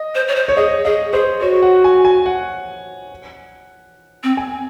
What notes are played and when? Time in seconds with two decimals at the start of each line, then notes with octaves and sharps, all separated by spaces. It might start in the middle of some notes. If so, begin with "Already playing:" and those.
Already playing: D#5
0.15 C5
0.28 C#5
0.36 C5
0.48 C#5
0.56 G#4 D#5
0.85 G#4 D#5
1.13 G#4 C5
1.41 F#4 C#5
1.62 F#5
1.84 G#5
2.05 G#5
2.26 F#5
4.24 C4
4.37 G#5